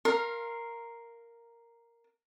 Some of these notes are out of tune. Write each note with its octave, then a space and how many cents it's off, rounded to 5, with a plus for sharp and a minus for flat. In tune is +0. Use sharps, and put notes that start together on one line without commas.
A#4 +0 F5 -10 C6 +25